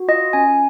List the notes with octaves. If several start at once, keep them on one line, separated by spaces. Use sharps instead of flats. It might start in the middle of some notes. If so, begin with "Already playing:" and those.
Already playing: F#4
F4 D#5
C#4 G#5